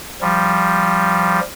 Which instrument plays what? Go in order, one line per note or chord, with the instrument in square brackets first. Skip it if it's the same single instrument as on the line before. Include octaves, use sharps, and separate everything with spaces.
[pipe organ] F3 G3